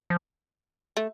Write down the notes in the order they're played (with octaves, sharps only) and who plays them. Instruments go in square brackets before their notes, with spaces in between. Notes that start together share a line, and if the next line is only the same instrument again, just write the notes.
[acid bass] F3
[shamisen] A3